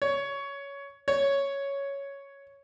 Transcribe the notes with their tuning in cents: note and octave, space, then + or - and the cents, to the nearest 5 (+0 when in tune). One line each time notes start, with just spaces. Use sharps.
C#5 +15
C#5 +5